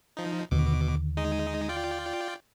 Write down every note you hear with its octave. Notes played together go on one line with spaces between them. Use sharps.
F3 D#4
D#2 B2 D3 D#3 D6
G#3 D#4 D#5
F4 D5 G5